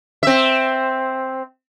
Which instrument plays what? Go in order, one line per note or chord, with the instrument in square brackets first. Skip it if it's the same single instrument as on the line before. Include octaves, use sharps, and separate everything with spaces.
[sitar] C4 E5